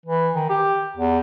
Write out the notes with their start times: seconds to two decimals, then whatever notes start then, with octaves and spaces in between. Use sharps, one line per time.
0.06 E3
0.35 D#3
0.49 G4
0.96 E2